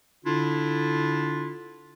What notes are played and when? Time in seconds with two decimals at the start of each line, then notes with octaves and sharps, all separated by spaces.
0.25 D3 D4 E4 F4